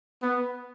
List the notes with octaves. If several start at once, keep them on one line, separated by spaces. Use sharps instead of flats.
B3